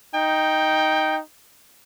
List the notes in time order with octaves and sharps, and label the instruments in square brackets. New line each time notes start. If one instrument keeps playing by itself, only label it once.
[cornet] D#4 [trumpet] G5